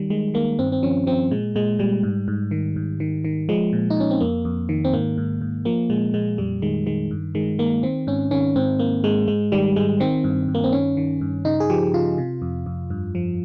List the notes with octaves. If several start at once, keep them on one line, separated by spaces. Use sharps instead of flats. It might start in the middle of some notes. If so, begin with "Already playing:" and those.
Already playing: D#3 G3
D#3 G#3
D#3 A#3
G2 C4
C4
F3 C#4
F3 C4
A#2 G#3
A#2 G#3
A#2 G3
G#2
G#2
D#3
G#2
D#3
D#3
F3 G#3
A#2
D#4
A#2 C#4
C4
F2 A#3
F2
D#3
C4
G#2 A#3
G#2
G#2
F3 A#3
A#2 G#3
A#2 G#3
F2 G3
D#3 G#3
D#3 G#3
G2
D#3 G#3
D#3 A#3
D#3 C4
G#2 C#4
D#3 C#4
G#2 C4
G#2 A#3
G#2 G#3
G#2 G#3
D#3 G3
G#2 G#3
D#3 C4
G2
G2
A#3
C4
D#3 C#4
D#3
G2
C#3 D#4
G#4
F3 G4
C#3 F4
C3
F2
F2
G2
F3